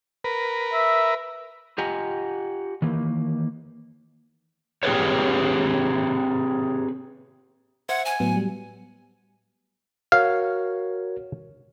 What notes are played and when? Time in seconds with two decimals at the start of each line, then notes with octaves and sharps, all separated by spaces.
0.24 A#4 B4
0.73 E5
1.78 F4 G4 D#5 F#5 G#5 A#5
2.82 D#3 E3 A#3
4.83 C4 G4 G#4 B4 C#5
7.89 C5 E5 F#5 G#6
8.05 G#5
8.20 A2 F#3 B3
8.36 G3
10.12 F#4 A#4 C#5 F5